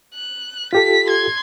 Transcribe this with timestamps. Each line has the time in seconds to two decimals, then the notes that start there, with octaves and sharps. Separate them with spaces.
0.14 F#6
0.73 F4 G4 A4 B6
1.08 C6 G#6